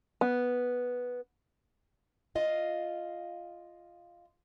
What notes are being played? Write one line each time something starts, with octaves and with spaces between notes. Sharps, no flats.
B3
F4 D#5 F5